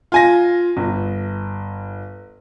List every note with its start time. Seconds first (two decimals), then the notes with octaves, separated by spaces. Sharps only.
0.12 F4 G#5 A#6
0.77 G1